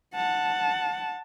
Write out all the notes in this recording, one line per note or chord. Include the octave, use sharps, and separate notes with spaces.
F#5 A5